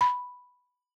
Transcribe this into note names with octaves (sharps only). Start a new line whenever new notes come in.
B5